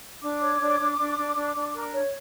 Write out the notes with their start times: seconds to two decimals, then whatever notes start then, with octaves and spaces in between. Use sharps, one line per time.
0.21 D4 D6
0.41 C#5
0.60 D4
0.80 D4
0.99 D4
1.18 D4
1.36 D4
1.55 D4
1.74 A#4
1.93 C#5